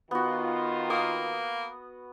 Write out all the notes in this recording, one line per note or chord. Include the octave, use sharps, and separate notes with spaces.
D#3 B3 F4 F#4
A#3 D#6